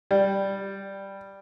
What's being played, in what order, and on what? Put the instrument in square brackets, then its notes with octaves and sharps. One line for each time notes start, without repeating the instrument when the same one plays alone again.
[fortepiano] G3